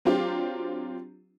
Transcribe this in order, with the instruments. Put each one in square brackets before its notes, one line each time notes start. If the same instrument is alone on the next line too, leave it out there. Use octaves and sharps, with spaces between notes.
[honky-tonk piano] F#3 C4 D4 F4 G4